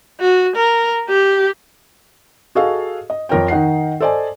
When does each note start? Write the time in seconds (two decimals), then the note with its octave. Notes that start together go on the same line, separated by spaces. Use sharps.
0.21 F#4
0.56 A#4
1.09 G4
2.55 F#4 G#4 A4 D#5 F5
3.10 D#5
3.29 F2 F3 A#4 C#5 G5
3.48 D#3 D#4 F#5 C7
4.00 A4 C5 D5 D#5 G#5